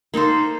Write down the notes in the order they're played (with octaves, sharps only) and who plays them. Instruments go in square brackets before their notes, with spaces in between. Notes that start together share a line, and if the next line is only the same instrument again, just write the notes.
[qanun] A#3 D#4 A4 C5